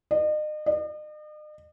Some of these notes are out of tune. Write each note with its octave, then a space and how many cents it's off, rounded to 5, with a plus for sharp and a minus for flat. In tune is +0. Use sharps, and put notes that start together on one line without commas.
D#5 -40
D#5 -45